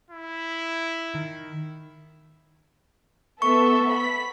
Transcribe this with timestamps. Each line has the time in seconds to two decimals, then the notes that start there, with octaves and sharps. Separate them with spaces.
0.11 E4
1.14 D#3
3.42 B3 A4 E5 C#6
3.91 B5 B6